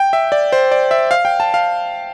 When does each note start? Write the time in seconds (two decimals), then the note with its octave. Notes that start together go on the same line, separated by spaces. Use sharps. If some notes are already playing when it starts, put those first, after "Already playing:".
Already playing: G5
0.13 E5
0.32 D5
0.52 C5
0.71 D5
0.91 E5
1.11 F5
1.25 G5
1.40 A5
1.54 F5